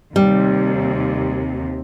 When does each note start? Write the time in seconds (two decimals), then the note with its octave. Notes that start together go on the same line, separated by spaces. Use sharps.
0.16 D#2 C3 G3